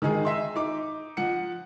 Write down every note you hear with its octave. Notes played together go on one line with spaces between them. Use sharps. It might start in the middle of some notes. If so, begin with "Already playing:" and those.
D#3 G#3 D#4 G#4
D#5 E5 C6
D#4 D6
F3 F#5 C#7